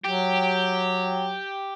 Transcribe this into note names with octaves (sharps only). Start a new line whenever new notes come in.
F#3 G4